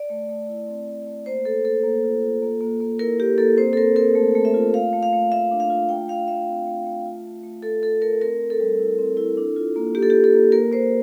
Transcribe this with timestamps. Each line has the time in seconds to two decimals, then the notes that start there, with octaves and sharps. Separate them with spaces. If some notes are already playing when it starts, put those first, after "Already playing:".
Already playing: D5
0.10 A3
0.29 A3
0.48 E4
0.68 C4
0.88 A3
1.06 A3
1.26 A#3 C5
1.45 A#3 A4
1.65 A#3 A4
1.83 A#3
2.04 F4
2.22 F4
2.42 A#3
2.61 A#3
2.80 A#3
2.99 E4 A#4
3.19 E4 G4
3.38 A#3 A4
3.58 C4 C5
3.73 A4
3.77 C4 A#4
3.96 C4 A#4
4.15 A3
4.35 A3
4.45 E5
4.54 F4
4.73 A3 F5
4.93 A3
5.03 F5
5.13 A3
5.31 A3 E5
5.51 D4
5.60 F5
5.70 F4
5.89 A3 G5
6.08 A3 F5
6.28 A3 E5
6.47 C4
6.67 A3
6.86 A3
7.06 F4
7.24 A3
7.43 A3
7.63 F4 A4
7.82 A3 A4
8.02 A3 A#4
8.21 C4 A#4
8.40 C4
8.50 A4
8.60 G3
8.79 E4
8.99 C4
9.17 E4
9.37 D4
9.56 F4
9.76 A#3
9.95 A#3 G4
10.03 A4
10.10 A#3 G4
10.24 A4
10.34 A#3
10.52 A#3 A#4
10.71 A#3 C5